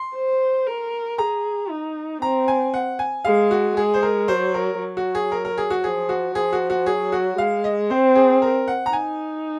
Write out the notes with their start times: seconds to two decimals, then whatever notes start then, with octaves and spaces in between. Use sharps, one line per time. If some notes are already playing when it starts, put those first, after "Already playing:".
Already playing: C6
0.15 C5
0.66 A#4
1.18 G#4 A#5
1.70 D#4
2.22 C4 A#5
2.48 G#5
2.74 F#5
2.99 G#5
3.25 G#3 F5
3.51 F#4
3.76 G#3 G#4
3.94 C5
4.03 A#4
4.28 F#3 C5
4.54 A#4
4.80 F#3
4.97 F#4
5.15 G#4
5.32 A#4
5.45 A#4
5.58 G#4
5.70 F#4
5.83 F3 G#4
6.09 F#4
6.35 F3 G#4
6.53 F#4
6.70 F#4
6.86 F#3 G#4
7.12 F#4
7.38 G#3 F5
7.64 D#5
7.90 C4 C5
8.15 G#4
8.42 A#4
8.68 F#5
8.86 A#5
8.93 D#4 G#5